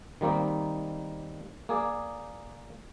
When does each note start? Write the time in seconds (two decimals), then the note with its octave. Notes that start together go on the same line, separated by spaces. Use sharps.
0.21 D#3 G3 A#3 C4 D#4
1.69 A#3 G#4 D5